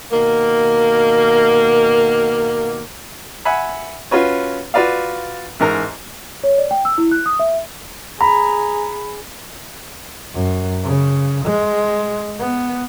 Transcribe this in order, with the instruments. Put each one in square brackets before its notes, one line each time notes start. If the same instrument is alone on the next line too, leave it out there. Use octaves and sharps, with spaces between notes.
[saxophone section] B2 D#3 A#3
[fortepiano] E5 F#5 G#5 B5
C#4 F4 F#4 B4 C#5
F4 F#4 B4 D5 F5
A1 G#2 A#4 A#5
[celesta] C#5
D5
G5
E6
E4
F#6
D#6
E5
[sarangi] G#4 [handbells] A#5 [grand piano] B5
[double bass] F#2
C#3
G#3
B3